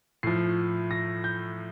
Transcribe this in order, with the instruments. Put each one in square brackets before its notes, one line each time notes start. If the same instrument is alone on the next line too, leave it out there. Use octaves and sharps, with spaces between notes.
[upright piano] A2 F3 C7
A#6
G6